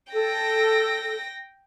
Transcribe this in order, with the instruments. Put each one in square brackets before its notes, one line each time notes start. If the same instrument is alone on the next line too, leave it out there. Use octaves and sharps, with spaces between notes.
[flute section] A4 [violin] G5 A#6